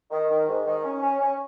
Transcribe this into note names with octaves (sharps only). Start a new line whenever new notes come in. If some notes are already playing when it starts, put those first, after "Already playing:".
D#3
D#3
G#2
D#3
C#4
C#4
C#4